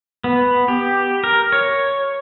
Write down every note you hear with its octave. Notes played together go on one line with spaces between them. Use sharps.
B3
G4
A#4
C#5